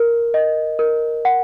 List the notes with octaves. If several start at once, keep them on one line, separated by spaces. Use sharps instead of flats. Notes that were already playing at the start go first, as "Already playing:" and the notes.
Already playing: A#4
D#5
A#4
F#5